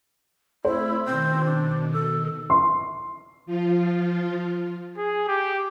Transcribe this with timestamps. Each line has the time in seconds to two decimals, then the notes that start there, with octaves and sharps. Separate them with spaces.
0.65 A3 C4 E4 C5 B5
1.06 B2 D#3 C4
1.45 D4
1.92 A4
2.50 C6
3.46 F3 F4
4.98 G#4
5.28 G4